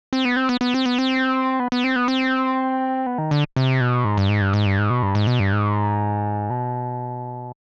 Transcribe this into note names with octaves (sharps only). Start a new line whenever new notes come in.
C4
B3
C4
B3
B3
C4
B3
C4
B3
B3
C4
B3
C4
B3
D#3
D3
C3
B2
G#2
G2
G#2
G2
G#2
G2
G#2
B2
G2
G#2
B2
G2
G#2
B2